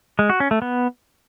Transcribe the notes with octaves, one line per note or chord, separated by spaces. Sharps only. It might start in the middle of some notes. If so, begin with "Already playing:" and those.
G#3
F#4
C#4
A3
B3